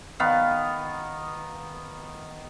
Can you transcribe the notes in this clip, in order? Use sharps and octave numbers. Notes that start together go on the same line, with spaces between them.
D#3 B3 F5